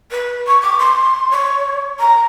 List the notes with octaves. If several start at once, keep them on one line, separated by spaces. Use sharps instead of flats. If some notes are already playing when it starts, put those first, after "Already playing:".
B4
C#6
D6
C6
C#5
A#5